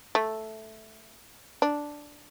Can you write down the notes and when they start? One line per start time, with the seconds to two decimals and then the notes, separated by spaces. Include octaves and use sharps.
0.15 A3
1.62 D4